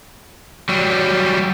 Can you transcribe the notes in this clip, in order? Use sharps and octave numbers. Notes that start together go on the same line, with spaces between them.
F#3 G3